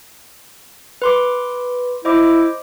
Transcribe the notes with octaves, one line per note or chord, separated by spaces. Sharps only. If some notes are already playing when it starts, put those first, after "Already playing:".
B4 C6 D6
E4 C5 D#5 D6